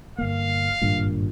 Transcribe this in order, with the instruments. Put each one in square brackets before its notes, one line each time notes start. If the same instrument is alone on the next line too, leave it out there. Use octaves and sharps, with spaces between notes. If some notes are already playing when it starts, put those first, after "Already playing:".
[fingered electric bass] G1 A#3 [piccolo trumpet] F5
[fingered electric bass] G#1 G2 A#2